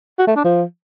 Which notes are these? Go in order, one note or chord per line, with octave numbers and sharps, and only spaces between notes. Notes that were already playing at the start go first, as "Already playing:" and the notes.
F#4
A3
D4
F3